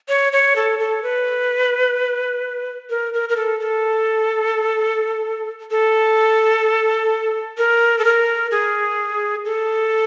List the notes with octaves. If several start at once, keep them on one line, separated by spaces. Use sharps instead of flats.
C#5
C#5
A4
A4
B4
A#4
A#4
A#4
A4
A4
A4
A#4
A4
A#4
G#4
A4